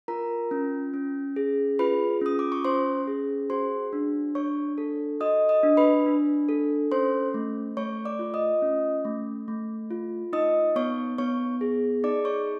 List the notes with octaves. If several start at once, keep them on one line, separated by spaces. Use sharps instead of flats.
F4 A#4 A#5
C#4
C#4
G#4
F4 B4 B5
C#4 D#6
D6
C#6
C#4 C5 C6
G#4
F#4 C5 C6
D4
D4 C#5 C#6
A4
F#4 D#5 D#6
D#5 D#6
D4
B4 B5
D4
A4
C#4 C5 C6
A3
A3 C#5 C#6
D5 D6
F4
D#5 D#6
C#4
A3
A3
F4
D#4 D#5 D#6
B3 C#5 C#6
B3 C#5 C#6
G#4
D#4 D5 D6
C#5 C#6